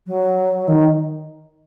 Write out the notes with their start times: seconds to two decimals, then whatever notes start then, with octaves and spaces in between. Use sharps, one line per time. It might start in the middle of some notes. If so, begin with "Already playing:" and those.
0.07 F#3
0.68 D#3